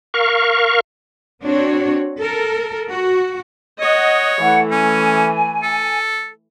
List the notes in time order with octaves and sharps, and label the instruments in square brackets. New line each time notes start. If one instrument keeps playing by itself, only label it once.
[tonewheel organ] A#4 F5 C#6
[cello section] C4 D4 F#4 C#5
A4 A#4
F#4
[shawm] C#5 [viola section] D#5 F#5
[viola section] E3 A3 [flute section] F#5
[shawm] C#4 [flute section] G#5
[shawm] A4